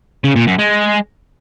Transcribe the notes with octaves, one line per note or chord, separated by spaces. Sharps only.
C#3
A#2
F#2
G#3